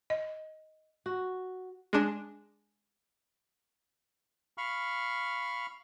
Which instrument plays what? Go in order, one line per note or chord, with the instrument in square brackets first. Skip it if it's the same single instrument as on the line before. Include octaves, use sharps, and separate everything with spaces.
[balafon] D#5
[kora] F#4
[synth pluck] G#3 D4
[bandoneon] F5 B5 C#6 F6